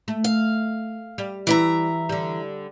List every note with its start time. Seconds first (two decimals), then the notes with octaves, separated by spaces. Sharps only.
0.08 A3
0.24 F5
1.18 G3
1.47 E3 E5 A#5
2.09 D3 G3